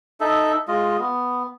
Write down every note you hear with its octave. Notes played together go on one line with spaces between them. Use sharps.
D#4 A4 E5
G#3 F4 D#5
B3